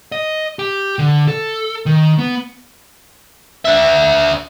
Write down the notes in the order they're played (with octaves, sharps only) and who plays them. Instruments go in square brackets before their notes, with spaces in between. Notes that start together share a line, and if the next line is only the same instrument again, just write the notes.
[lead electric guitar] D#5
G4
D3
A4
D#3
B3
[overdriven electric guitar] D4 E5